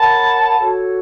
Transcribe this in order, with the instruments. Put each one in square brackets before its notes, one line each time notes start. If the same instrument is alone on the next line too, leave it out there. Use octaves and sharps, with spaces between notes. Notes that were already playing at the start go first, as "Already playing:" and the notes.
Already playing: [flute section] A#4 C#5 F#5 B5 [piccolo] A5
[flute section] F#4 A4 C#5